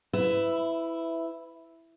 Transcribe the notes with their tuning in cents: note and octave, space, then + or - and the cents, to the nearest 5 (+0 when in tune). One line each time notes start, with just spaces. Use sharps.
E4 +0 B4 +25 E5 +5